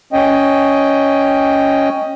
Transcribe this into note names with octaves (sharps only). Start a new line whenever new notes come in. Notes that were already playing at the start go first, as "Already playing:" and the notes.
C#4 D#5 G5